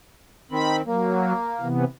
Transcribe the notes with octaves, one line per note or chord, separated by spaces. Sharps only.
D#3 C4 B5
F#3 A#3
C3 E3 B3